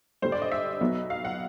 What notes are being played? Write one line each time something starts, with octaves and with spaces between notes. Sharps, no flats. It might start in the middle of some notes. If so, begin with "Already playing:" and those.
G2 D3 G3 C5
D5
D#5
E5
B1 B2 F#3 B3 D#4
F5
F#5